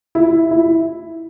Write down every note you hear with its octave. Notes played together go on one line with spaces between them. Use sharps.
E4
E4